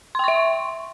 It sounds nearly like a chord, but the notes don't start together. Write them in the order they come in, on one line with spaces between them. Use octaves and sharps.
C6 G5 C#6 E5